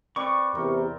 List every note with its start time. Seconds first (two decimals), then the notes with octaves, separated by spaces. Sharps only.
0.16 C4 B4 D5 C#6
0.55 E2 C3 A#4